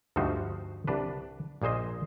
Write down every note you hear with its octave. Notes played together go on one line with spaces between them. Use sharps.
D2 G2 F3 D#4 F#4 C5
C2 D4 B4
A#1 A#2 G#4 C5 D#5